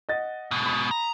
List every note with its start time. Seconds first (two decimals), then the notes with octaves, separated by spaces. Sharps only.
0.09 D#5 F#5 A6
0.51 G#2 B2
0.66 B5 D#6
0.91 A#5